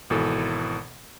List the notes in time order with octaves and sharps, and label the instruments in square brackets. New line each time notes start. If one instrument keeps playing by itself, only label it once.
[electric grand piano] G#1 B2 E3 A4